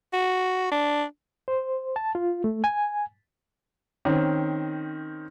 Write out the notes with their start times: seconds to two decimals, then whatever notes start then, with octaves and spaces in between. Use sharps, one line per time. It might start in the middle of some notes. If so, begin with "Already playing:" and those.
0.13 F#4
0.72 D4
1.48 C5
1.96 A5
2.15 F4
2.44 A3
2.64 G#5
4.05 D#3 C4 C#4